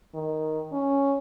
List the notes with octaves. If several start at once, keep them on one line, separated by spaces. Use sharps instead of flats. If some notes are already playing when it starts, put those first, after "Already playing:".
D#3
C#4